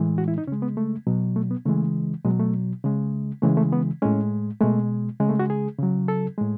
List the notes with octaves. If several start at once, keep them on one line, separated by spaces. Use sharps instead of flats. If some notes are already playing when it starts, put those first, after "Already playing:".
Already playing: A2 E3 G#3
F#4
E4
D#4
C#3 G#3 C#4
B3
A3
B2 F#3
A3
B3
C#3 E3 G#3 A3
B2 F#3 G#3
A3
C#3 G#3
C#3 E3 G#3 A3
A3
B3
A2 G#3 C#4
B2 G#3 A3
C#3 G#3
A3
F#4
G#4
C#3 F#3
A4
A2 G#3